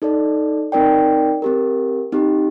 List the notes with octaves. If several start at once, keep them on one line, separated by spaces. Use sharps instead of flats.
D#4 A4 D5
C4 D#4 A#4 D5 G5
C4 G4 A#4
C4 D#4 G4